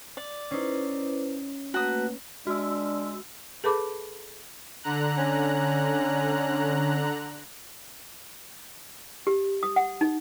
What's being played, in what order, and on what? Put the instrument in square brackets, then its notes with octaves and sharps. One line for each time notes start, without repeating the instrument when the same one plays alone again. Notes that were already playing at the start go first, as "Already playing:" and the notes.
[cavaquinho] D5
[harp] C#4 D#4 [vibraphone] E4 B4 C5
[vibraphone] A3 A#3 B4 [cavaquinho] F#4 D#6
[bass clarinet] G#3 [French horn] D4 [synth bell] F#4 E6
[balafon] G#4 A4 B4 A5 B5 D6
[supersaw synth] D3 A#5 F#6
[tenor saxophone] C#4
[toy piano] G4
D#6
F#5
D#4